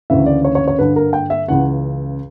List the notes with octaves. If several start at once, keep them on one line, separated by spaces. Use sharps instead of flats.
D2 C#3 E3 E5
D5
C#5
C#5
C#5
G2 D3 B4
A#4
G5
E5
C#2 C#3 E3 F#5